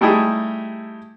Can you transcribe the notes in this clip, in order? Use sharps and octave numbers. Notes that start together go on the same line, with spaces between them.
G3 A3 D#4 E4 G4 G#4